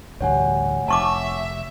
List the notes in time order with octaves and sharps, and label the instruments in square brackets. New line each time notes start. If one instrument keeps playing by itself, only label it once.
[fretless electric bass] A1 D2 G2 [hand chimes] C#5 F#5 G#5
[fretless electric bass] F1 [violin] E5 [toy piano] A5 C#6 D6